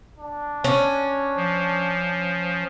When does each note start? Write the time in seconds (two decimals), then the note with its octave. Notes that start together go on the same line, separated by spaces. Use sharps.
0.19 D4
0.64 C#4
1.37 F3